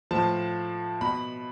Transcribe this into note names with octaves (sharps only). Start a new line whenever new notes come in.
A2 F3 A5
B2 B5